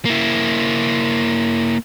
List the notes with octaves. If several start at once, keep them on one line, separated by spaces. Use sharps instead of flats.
A#3 E4